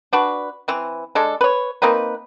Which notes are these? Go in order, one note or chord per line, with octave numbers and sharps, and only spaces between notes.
D4 F#4 B4
E3 C4
G#3 D4 A4
B4 C#5
A#3 C4 D#4 B4